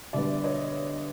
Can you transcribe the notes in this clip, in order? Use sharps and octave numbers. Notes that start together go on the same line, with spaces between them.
D3 G3 B3 D5 E5
C#5 D#5